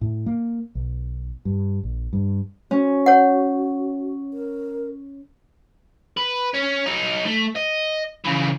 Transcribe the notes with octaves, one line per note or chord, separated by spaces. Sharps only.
A2
A#3
B1
G2
A#1
G2
C#4 F#4
C#5 F#5
A#4
B4
C#4
F#3 D#4
A3
D#5
C#3 E3